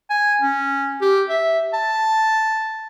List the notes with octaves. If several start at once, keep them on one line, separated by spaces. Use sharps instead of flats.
G#5
C#4
G4
E5
A5